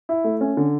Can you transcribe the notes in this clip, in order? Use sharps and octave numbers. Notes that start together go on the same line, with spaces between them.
E4
A3
C#4
D3